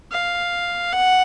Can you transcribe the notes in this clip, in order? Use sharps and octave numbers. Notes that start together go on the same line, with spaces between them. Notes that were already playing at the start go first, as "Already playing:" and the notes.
F5
F#5